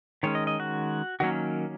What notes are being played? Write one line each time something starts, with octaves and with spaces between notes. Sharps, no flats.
D#3 G#3 C#4 C#5
D#5
D#5
F#4
D#3 F#3 A#3 C#4 F#4